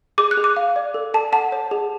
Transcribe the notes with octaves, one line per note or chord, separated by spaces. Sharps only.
G#4 D6
F#6
G#4
D6
F5
D5
A4
A4 A5
F#5 A5
C#5
G#4